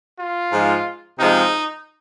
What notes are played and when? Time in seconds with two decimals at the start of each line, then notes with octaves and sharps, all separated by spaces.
0.19 F4
0.52 G#2 F3 G#3
1.19 C3 F3 G#3 D#4